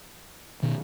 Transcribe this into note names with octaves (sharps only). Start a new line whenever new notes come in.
B2 D#3